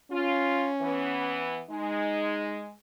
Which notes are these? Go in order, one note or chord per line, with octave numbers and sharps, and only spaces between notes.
C#4 F4
E3 B3
G#3 D#4